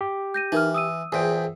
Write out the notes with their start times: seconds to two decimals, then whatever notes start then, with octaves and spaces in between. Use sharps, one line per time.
0.01 G4
0.34 G6 A#6 D#7
0.52 E3 D#4 A#4 F6
0.74 D#6 E6 D#7
1.12 E2 A#2 G#4 C5 G5